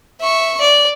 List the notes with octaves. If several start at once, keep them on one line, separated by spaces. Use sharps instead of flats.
E5 C#6
D5